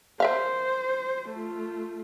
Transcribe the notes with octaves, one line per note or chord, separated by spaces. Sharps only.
A#4 C5 E5 F5
A3 F4